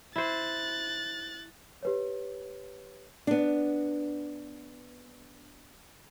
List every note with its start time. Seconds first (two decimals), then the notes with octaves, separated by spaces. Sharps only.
0.16 E4 C5 F#6 A6
1.83 G4 B4 C#5
3.27 B3 D4